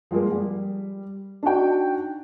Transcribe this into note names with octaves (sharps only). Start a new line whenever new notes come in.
F3 G3 G#3 A#3
G3
D4 D#4 F#4 G5